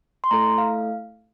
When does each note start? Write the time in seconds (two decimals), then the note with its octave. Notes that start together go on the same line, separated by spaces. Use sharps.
0.24 C6
0.31 A3 E4 A4 A#5
0.58 F5